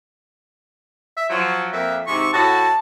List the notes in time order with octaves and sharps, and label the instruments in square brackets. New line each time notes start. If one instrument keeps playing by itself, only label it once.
[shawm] E5
[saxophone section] F3 F#3 [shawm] C#5
[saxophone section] F2 A#3 [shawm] E5
[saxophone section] G#2 C3 [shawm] C#6
[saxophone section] A2 F#4 [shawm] A5